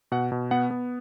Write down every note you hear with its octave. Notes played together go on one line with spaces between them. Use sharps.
B2 F#5
B2
B3 F#5
B3